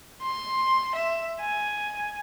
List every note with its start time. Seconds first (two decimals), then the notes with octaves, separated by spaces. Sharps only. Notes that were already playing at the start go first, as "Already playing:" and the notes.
0.23 C6
0.95 E5
1.41 G#5